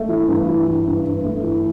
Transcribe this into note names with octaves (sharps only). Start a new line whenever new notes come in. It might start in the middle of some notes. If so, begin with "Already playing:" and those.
Already playing: A3
E3
G2
E3
E3
G2
G2
A3
E3